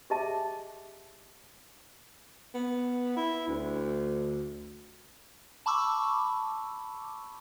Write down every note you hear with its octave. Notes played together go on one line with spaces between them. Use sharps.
G4 G#4 D#5 E5 A5 D6
B3
E4
D2
A5 B5 C#6 D6 E6